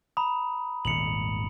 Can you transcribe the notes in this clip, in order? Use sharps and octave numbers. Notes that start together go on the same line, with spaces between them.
A#5 B5 D#6
D#1 G#1 G#2 C#7 F7 F#7